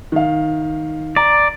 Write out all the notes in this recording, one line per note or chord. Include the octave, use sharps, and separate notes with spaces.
D#3 F5
D5 A#5